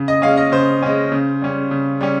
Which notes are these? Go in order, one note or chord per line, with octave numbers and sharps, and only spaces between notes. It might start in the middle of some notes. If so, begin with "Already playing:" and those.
Already playing: C#3
D#5
G#3 C#4 F5
D#5
C#3 C5
G#3 C#4
C#3
G3 C#4
C#3
G3 C#4